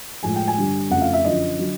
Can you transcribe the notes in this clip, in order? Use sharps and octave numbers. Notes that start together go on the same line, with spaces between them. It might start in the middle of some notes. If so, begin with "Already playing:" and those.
A2 F3 G#3 G#5
G5
G#5
G2 D3 G3
F2 C#3 F3 A3 F#5
F5
E5
F#2 D3 F3 D#5
D3 F#3